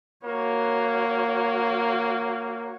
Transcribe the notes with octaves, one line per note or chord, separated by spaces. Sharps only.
A#3 F#4 C#5